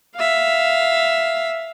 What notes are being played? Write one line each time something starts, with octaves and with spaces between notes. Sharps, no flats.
E5 F5